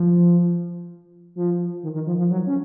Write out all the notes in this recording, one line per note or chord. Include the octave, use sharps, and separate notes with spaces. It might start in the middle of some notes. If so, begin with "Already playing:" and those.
Already playing: F3
F3
D#3
D#3
F3
F3
F#3
C#4